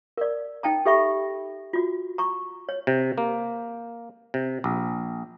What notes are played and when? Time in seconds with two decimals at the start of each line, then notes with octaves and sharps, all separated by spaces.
0.18 A#4 D5
0.63 D#4 G5 A5 A#5
0.86 G4 A4 E5 B5 C#6
1.73 F4 F#4
2.18 A#5 C#6
2.69 C#5
2.87 C3
3.18 A#3
4.34 C3
4.64 A#1